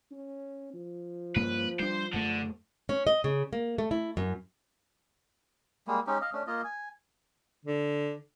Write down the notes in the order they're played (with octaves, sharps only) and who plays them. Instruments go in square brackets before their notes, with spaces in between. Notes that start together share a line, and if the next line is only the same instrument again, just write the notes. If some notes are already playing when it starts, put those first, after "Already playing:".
[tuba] C#4
F3
[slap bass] G2 A#3 C#4 [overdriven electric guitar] B4
[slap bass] G3 D4 [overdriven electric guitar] C5
[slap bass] F#2 A3 [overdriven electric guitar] D3
[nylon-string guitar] C#4
D#5
C#3
A#3
A3
E4
F#2
[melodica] G3 G#3 A#3
G#3 C#4 D#4 G4
D#5 F5
A3 C#4 D4
A#3 F4 D#5
G#5
[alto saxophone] D3